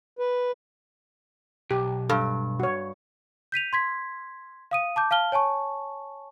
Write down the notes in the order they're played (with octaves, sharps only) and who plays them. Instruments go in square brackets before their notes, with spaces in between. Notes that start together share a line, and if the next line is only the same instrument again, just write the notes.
[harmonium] B4
[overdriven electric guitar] B1 [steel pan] G4
[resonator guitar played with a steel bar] G2 [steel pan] A4
[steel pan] F#4 C#5
[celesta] G6 B6 D#7 F7
C6 G#6 B6
F5 D#6 D#7
A5 D6 G6
F5 A5 F6 G7
C#5 G#5 A5 C#6